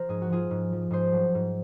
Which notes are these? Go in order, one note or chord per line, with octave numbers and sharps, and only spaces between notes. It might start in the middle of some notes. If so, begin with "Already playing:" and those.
Already playing: F3 A#4 C5
G#2 G#4
F#4
F3 F4 G#4
G#2
F3
G#2 G#4 C5
F#3
G#2